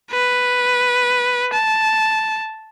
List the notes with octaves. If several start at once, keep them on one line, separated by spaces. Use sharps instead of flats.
B4
A5